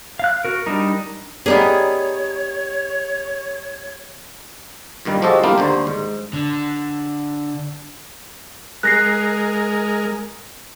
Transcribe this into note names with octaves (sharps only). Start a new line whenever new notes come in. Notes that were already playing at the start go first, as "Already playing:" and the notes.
F5 F#6
F#4 A#4
G3 D4 D#4 A#4
B3 D#4 G4 G#4 A#4 C#5 D5
G2 A#2 D#3 G3
F3 G#3 F#4 G4 A4 D#5
G3 A#3 D4 E4 F4 G4
D#2 D3 C5
G#2
D3
G#3 A#4 F#6 A#6 C7